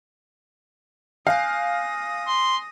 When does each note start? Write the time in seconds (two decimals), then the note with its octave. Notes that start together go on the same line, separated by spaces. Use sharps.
1.27 F5 G#5 D#6 F#6 G6 A#6
2.28 C6